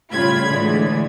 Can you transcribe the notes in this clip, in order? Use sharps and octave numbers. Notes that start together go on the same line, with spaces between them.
A2 C#3 G3 F4 B5 G#6
A2 D3 E3 G#3